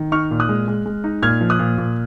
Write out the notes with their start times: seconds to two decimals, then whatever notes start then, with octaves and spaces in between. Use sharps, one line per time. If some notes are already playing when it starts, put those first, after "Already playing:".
Already playing: D#3
0.12 D#4 C#6 F6
0.31 A#2
0.40 D#6 F#6
0.49 G#3
0.68 G#3
0.86 G#3
1.04 D#4
1.22 A#2 F6 G#6
1.41 F3
1.50 D#6 F#6
1.59 A#2
1.78 A#2